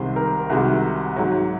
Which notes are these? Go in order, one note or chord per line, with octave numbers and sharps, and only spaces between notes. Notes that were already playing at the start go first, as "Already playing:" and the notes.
Already playing: C2 C3 D#3 G#3 C5
A#4
C2 C3 D#3 G#3 F#4
G#2 F#3